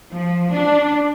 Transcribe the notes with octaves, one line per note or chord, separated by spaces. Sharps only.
F3
D4